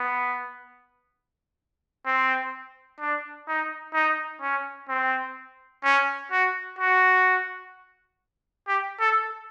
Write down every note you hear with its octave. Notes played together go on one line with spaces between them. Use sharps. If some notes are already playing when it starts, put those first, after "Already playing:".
Already playing: B3
C4
D4
D#4
D#4
C#4
C4
C#4
F#4
F#4
G4
A4